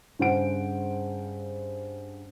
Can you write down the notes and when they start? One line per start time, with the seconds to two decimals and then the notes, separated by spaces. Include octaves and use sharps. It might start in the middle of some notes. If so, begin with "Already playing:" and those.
0.19 G2 C#3 C5 F#5 D7